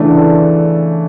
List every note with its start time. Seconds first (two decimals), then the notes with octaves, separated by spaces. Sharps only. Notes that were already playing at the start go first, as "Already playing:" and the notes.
Already playing: C#3 E3 A3 D4